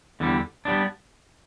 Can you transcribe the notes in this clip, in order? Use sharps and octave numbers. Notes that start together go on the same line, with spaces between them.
E2 D3 G3
G3 B3 D4